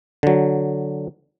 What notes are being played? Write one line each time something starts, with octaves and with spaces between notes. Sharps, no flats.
D3 F#3